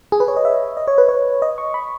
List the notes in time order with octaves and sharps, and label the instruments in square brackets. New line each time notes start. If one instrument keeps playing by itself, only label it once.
[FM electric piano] G#4
B4
C#5
D#5
E5
D#5
C#5
B4
C#5
D#5
C#6
B5